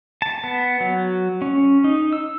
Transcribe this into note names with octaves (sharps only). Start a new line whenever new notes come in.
A5
B3
F#3
C#4
D#4
E6